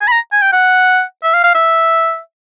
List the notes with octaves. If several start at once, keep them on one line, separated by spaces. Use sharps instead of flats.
G#5
B5
A#5
G#5
G5
F#5
E5
F5
F5
E5